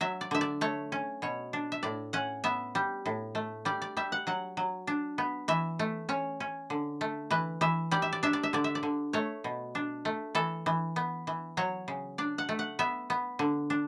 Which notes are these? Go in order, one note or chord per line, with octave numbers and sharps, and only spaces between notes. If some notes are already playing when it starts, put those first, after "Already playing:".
F#3 E5
D5
D3 E5
D5
A3 C#5
C#4
B2 C#5
D4
E5
A2 D5
C#4 F#5
B3 E5
G3
A2
A3
G3 D5
D5
G3 E5
F#5
F#3 F#5
F#3
D4
B3
E3 E5
A3
C#4 C#5
C#4
D3
A3
E3 B4
E3 E5
G3 D5
E5
D5
D4 E5
D5
E5
D3 D5
E5
D5
D3
A3 C#5
B2
D4
A3
E3 A4
E3
B3
E3
F#3 C#5
C#3
D4 D5
F#5
A3
F#5
B3 E5
B3
D3
D4